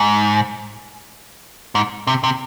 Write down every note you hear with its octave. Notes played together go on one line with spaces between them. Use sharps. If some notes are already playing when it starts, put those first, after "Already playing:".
Already playing: G#2
G#2
C3
C3